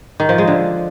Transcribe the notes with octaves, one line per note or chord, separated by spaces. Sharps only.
D#3
F3
G#3
D3